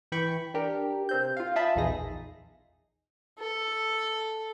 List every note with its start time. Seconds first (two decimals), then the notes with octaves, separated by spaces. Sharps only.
0.12 E3 G5 B5 C#6
0.54 D4 G4 A#4
1.09 C3 C4 G6
1.37 F4 F5
1.56 F4 D#5 E5 A5 B5
1.76 A#1 E2 D#4 G#4 A#6
3.39 A4